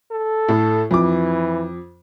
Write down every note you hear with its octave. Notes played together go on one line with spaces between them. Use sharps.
A4
A2
F2 E3 D6